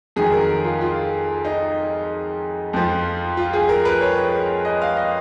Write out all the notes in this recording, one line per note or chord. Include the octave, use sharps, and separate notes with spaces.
F2 D#3 F#3 G#4
A#4
F4
F4
D#4
F2 F3
F4
G#4
A#4
B4
C#5
D#5
F5
D#5